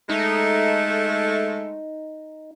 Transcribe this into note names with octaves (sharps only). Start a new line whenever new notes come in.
G#3 A3 D#4